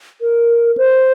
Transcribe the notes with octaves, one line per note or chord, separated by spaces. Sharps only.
A#4
C5